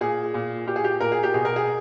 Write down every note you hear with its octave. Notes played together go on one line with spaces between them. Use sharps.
A#2 G#4
A#2
A#2 G4
G#4
G4
A#2 A#4
G#4
G4
B2 G#4
A#4
G#4